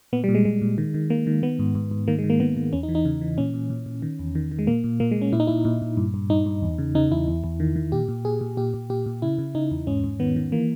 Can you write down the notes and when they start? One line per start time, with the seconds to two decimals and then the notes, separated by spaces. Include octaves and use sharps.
0.13 A#2 B3
0.24 G3
0.29 A#2
0.35 G#3
0.45 A#2 G#3
0.62 A#2
0.78 D#3
0.94 D#3
1.10 D#3 A#3
1.27 D#3
1.43 D#3 B3
1.59 G#2
1.75 G#2
1.91 G#2
2.08 D#3 A#3
2.19 G#3
2.24 D#3
2.30 A#3
2.40 D#3 B3
2.57 D#3
2.73 E2 C#4
2.83 D#4
2.89 E3
2.95 D#4
3.05 C#3
3.21 E3
3.37 A#2 C#4
3.54 A#2
3.70 A#2
3.86 A#2
4.02 D#3
4.19 E2
4.35 D#3
4.52 D#3
4.59 G#3
4.67 A#2 A#3
4.84 A#2
5.00 A#2 A#3
5.11 G#3
5.16 A#2
5.22 C#4
5.32 A#2 E4
5.40 D#4
5.47 A#2 E4
5.65 A#2
5.82 A#2
5.97 G2
6.14 G2
6.30 G2 D#4
6.46 G2
6.62 E2
6.78 C#3
6.95 C#3 D#4
7.12 E2 E4
7.28 E2
7.44 E2
7.60 D#3
7.76 D#3
7.92 A#2 G4
8.08 A#2
8.25 A#2 G#4
8.41 A#2
8.57 A#2 G4
8.74 A#2
8.90 A#2 G4
9.06 A#2
9.22 C#3 E4
9.38 C#3
9.55 C#3 D#4
9.71 E2
9.87 G#2 C#4
10.04 G#2
10.19 D#3 B3
10.36 D#3
10.52 E3 A#3